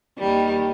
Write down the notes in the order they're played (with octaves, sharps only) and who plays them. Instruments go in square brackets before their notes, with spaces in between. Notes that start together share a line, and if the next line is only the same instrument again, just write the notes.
[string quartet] D#2 D#3 G3